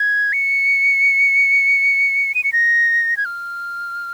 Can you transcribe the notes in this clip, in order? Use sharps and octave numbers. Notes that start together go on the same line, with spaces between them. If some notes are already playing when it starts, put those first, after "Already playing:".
Already playing: G#6
C#7
D#7
C#7
A#6
G#6
F6